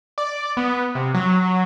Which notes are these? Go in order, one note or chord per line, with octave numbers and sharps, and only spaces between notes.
D5
B3
C3
F#3